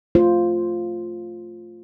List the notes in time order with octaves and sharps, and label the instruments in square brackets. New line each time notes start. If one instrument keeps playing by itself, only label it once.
[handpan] A3 F4 C5